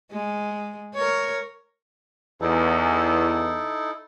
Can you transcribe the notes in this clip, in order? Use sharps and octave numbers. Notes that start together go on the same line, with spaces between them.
G#3
A#4 C#5
E2 D#4 E4 A4